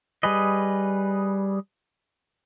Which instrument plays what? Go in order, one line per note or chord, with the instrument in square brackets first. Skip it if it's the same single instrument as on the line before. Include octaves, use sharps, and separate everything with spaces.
[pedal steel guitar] G3 G#4 B4 D#5